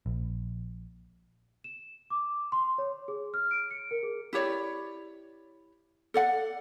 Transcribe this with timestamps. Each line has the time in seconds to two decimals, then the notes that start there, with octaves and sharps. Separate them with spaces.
0.06 A#1
1.64 E7
2.10 D6
2.52 C6
2.78 C#5
3.08 G#4
3.34 F6
3.51 D7
3.71 C#7
3.91 A#4
4.03 G#4
4.33 E4 G4 C#5 D5
6.14 A4 D5 F#5